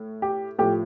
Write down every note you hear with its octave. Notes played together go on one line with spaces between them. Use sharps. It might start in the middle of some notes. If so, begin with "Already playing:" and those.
Already playing: A2
G4
A2 F3 G4